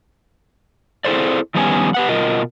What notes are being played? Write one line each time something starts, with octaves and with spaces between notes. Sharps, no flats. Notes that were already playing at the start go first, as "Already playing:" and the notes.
C4 E4 G#4 A4 C5 D5
F2 D#3 G3 B3 C#4 G#5
G4 B4 F#5
B2 F4 A#4 D#5